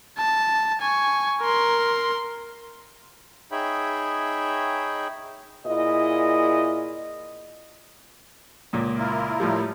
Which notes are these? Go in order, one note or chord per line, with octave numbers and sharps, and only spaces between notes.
A5
G#5 C#6
A#4 C6
D#4 G#4 C#5 E5 G5 B5
A#2 E4 G#4 D#5
C#2 A#2 A#3
E4 F4 A#4
A2 F3 G3